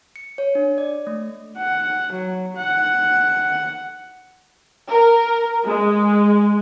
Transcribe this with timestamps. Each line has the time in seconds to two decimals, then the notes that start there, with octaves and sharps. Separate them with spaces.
0.16 C#7
0.38 C#5
0.55 D4
0.78 D5
1.07 A3
1.57 F#5
2.13 F#3
2.57 F#5
4.89 A#4
5.65 G#3